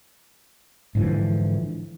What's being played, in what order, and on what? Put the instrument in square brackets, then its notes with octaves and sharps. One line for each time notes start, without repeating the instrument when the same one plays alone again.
[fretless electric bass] G#2 D3 E3 F3